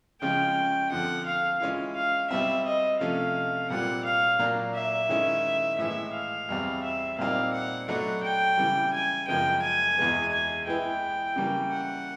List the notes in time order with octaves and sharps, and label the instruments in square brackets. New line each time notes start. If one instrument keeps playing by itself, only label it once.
[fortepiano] C#3 F3 G#3 C#4 F4 [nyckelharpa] G5
[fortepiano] F2 D3 F3 [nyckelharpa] F#5
[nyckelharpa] F5
[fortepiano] E3 G#3 C#4 F4
[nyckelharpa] F5
[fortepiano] B2 G3 C4 [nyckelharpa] E5
[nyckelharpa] D#5
[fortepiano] C3 F3 A3 C#4 [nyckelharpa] F5
[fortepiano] A#2 G3 C4 F4 [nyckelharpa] F#5
[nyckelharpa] F5
[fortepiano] A#2 F#3 A#3 D4
[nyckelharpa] E5
[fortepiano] D#3 G#3 C#4 E4
[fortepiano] A2 E3 G#3 B3 [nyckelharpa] E5
[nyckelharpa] F5
[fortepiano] E2 B2 G3 C4
[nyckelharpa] E5
[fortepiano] A#2 G3 C4 D#4 [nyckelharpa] F5
[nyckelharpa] F#5
[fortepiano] B2 F#3 A3 D4 [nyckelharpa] F#5
[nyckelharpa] G5
[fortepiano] C#3 E3 G3
[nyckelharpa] G#5
[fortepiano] F#2 C#3 F3 G#3 B3 [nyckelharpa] G5
[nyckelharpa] G#5
[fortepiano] E2 B2 G#3 B3
[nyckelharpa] G#5
[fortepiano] E3 G#3 B3 E4 [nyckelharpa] G5
[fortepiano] C#3 E3 G3 A#3
[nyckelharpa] F#5